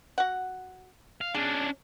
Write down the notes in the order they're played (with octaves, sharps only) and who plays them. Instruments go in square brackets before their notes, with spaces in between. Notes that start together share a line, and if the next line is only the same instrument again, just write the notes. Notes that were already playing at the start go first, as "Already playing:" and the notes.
[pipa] F#4 F#5
[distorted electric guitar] F5
[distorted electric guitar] C#4 D4 [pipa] G#4